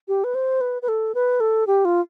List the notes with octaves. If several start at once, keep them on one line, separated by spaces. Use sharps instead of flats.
G4
B4
C5
B4
B4
A4
B4
A4
G4
F4